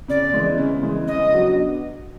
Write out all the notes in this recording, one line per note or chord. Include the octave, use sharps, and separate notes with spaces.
C#3 D5
E3 G#3
C#3
E3 G#3
C#3 D#5
F#3 B3 D4 F#4